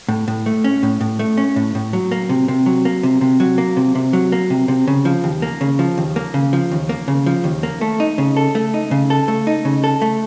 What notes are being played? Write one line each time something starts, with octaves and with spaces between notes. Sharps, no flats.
A2
A2
A3
C#4
A2
A2
A3
C#4
A2
A2
F#3
A#3
C3
C3
F#3
A#3
C3
C3
F#3
A#3
C3
C3
F#3
A#3
C3
C3
C#3
F3
D#2
A#3
C#3
F3
D#2
A#3
C#3
F3
D#2
A#3
C#3
F3
D#2
A#3
A3
D#4
C#3
A4
A3
D#4
C#3
A4
A3
D#4
C#3
A4
A3